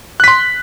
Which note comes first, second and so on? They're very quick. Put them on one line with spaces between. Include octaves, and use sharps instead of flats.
F#6 B6 C6